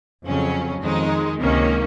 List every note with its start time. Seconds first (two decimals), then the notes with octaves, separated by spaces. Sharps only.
0.25 F2 C#3 F#3 C#4
0.82 F2 D#3 G#3 D#4
1.41 C#2 C3 D#3 A#3 C#4